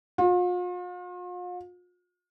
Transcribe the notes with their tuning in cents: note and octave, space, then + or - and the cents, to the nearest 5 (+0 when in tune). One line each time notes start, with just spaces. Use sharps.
F4 +40